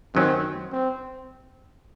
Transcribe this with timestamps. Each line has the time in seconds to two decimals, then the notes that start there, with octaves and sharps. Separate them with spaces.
0.15 F#2 D#3 F#3 C4 C#4
0.72 C4